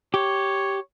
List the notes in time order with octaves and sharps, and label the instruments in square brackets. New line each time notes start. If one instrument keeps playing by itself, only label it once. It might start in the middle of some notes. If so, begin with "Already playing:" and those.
[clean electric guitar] G4 [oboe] C#5